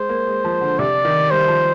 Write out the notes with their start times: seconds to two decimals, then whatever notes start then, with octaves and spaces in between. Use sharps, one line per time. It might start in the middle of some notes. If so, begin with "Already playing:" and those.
Already playing: G#3 C5
0.09 A#3
0.27 G#3
0.44 F3
0.61 D3
0.79 C3 D5
1.05 D#3
1.31 G3 C5
1.48 F3